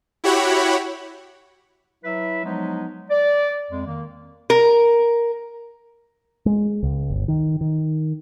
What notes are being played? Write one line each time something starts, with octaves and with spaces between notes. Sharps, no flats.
E4 F#4 G4 C#5 F#5 B5
F#3 E4 B4 E5
F3 F#3 G#3 B3 D#4
D5
F2 G#3
D#3 A#3
A#4
G#3
C#2
G1
D#3
D#3